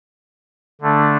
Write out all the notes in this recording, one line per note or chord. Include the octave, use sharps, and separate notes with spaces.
D3 A3 D4